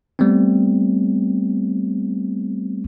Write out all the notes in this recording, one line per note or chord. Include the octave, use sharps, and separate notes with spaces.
G3 A3 B3 C4